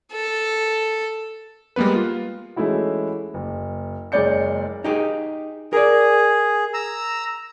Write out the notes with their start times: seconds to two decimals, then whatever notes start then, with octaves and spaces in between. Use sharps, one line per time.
0.13 A4
1.76 G3 G#3 A#3 B3 B4
1.95 F4
2.56 E3 G#3 A3 C#4 E4 F#4
3.34 F#1
4.12 F#1 G#3 C#5 D5 G6 C#7
4.84 D#4 G4 G#4
5.73 G#4 A#4 D5
6.74 A#5 E6